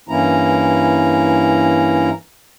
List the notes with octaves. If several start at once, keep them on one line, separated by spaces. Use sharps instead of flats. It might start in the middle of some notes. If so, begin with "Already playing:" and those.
G2 E3 A#3 C#4 E4 A#5